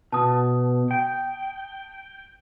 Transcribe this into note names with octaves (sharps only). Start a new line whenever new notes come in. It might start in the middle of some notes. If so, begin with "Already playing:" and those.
B2 A5 D#6
G5